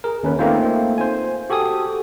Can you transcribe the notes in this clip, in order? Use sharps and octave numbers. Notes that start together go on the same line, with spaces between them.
G#4 A#4
D#2 C#4 B4
A3 A#3 C4 D#4 F4 C5
C5 G#5
F#4 G4 A4 G#5 D#6